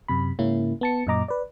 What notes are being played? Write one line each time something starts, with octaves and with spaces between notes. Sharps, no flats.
F#2 C3 B5
G#2 C#3 A#3 C#4 E4
B3 A5 C#7
F#2 A#2 D#5 A#5 D6
B4 D5